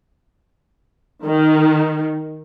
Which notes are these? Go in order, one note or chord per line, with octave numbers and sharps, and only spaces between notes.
D#3